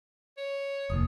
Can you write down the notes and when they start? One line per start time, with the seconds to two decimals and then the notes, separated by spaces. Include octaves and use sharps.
0.37 C#5
0.90 F1 D#2 D#6